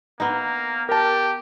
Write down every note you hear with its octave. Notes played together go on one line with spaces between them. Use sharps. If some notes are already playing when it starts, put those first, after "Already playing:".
A#3 B3 D#4
G4 A#4 A5